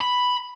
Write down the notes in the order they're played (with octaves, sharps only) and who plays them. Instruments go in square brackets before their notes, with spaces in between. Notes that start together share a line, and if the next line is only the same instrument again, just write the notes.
[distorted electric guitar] B5